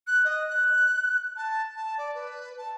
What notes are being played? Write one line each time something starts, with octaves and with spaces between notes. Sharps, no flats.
F#6
D#5
F#6
A5
A5
D5
B4
A5